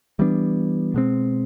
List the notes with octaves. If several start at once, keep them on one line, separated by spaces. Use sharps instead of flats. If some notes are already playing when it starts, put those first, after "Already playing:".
E3 G3 B3 D4
B2 G#3 C4